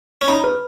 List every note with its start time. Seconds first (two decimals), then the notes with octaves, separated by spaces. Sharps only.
0.21 C#4
0.28 D#4 B5
0.44 B4